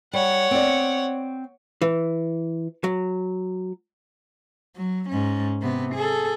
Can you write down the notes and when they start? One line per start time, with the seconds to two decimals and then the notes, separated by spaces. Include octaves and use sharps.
0.13 G3 C#5 F#5
0.51 C4 D5
1.82 E3
2.84 F#3
4.76 F#3
5.09 G#2 C#4
5.62 C3 B3
5.95 G#4 A4